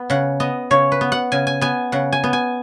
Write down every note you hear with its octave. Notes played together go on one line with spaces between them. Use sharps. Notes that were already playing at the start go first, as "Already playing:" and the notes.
Already playing: B3
C#3 F#5
B3 D#5
C#3 C#5
B4
B3
F#5
C#3 G#5
G#5
B3 G#5
C#3 F#5
G#5
B3
G#5